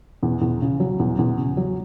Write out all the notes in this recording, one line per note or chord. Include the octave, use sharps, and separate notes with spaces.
E2
E2
C#3
F#3
E2
E2
C#3
F#3